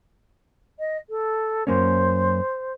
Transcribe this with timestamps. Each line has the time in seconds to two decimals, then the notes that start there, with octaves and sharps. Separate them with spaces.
0.79 D#5
1.09 A4
1.67 F#2 A#3 C#4 C5